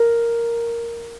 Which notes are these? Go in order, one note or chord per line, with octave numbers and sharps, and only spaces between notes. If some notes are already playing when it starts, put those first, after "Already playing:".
Already playing: A#4